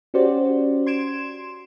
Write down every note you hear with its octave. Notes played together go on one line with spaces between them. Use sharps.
C#4 F#4 G4 C5 D5
C6 G#6 D7 E7